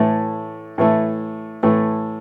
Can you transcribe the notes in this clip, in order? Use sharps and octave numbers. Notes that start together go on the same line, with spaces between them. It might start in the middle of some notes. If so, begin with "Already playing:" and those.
Already playing: A2 E3 A3
A2 E3 A3
A2 E3 A3